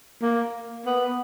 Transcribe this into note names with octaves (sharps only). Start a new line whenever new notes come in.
A#3
B3